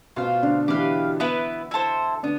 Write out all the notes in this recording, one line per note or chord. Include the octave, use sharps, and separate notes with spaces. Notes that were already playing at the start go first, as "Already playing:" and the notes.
B2 B3 F4 C5 F5
D3 D4
E3 E4 G4 B4 F5
B3 E4 B4
E4 A4 C5
D3 B3 D4